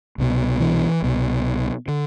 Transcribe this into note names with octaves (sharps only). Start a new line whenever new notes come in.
C2 B2
E3
C2 B2
D3